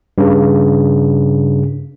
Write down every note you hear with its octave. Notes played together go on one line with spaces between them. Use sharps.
G2 C#3